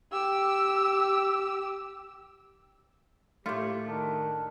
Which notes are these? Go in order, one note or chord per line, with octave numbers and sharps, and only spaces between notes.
G4 E6
A2 A3 A#3 F4 G4 C#5 F#6
D#3 D4